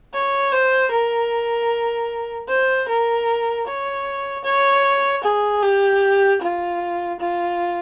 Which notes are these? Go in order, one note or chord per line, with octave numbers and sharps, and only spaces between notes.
C#5
C5
A#4
C5
A#4
C#5
C#5
G#4
G4
F4
F4